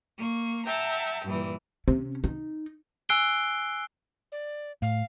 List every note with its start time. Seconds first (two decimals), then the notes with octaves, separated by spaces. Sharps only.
0.19 A#3 C#6
0.65 E5 F#5 G5 A5 A#5
1.25 G2 A#2 E3
1.88 C3 C#4
2.24 D#4
3.09 G#5 E6 F#6 C7 D7 G7
4.32 D5
4.82 A2 F5